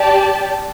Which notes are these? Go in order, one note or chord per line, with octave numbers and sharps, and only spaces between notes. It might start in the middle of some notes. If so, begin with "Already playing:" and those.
Already playing: G4 D5 A5